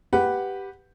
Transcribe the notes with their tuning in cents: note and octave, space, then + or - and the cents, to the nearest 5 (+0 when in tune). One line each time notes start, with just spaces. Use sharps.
G4 +0 B4 +0 F#5 +0